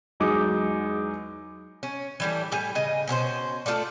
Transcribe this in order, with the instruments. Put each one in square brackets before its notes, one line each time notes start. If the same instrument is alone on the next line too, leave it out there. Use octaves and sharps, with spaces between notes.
[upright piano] E2 F#3 G#3 D#4 D6
[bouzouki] C#4
E3 G3 A3
A2 G3 G#5
C#3 D#5
B2 C#4 A#4 C5
A3 F4 A4 D5